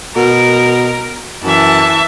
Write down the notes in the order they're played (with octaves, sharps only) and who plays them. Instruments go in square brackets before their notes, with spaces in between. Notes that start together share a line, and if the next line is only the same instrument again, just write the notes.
[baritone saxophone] B2 [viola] A#4
[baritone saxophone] F#2 [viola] E3 [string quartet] E5 A5